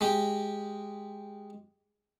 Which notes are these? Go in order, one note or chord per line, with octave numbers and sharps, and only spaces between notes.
G#3 G4